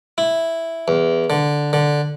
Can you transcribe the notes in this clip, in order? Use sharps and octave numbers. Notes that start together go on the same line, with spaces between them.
E4
E2
D3
D3